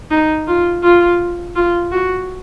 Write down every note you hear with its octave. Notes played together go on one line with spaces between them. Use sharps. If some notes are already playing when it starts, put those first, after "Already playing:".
D#4
F4
F4
F4
F#4